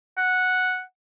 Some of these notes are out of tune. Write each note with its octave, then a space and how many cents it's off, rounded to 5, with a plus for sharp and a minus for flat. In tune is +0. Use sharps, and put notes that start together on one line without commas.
F#5 -5